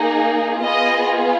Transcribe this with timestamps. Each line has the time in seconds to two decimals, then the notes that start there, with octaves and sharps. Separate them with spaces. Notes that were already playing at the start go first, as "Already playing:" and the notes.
Already playing: A#3 D#4 G#4
0.61 B3 F4 G#4 D#5